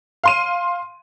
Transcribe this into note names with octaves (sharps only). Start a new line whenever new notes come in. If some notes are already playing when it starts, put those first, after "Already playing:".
F5 C6 D#7